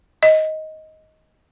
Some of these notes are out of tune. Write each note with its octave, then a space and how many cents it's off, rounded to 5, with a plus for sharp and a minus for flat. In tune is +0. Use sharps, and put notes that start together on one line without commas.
D#5 +10